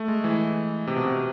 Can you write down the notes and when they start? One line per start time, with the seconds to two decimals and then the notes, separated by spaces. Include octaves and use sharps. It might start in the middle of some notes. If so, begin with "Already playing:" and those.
Already playing: A3
0.08 G#3
0.24 E3
0.87 C3
0.96 B2
1.06 C3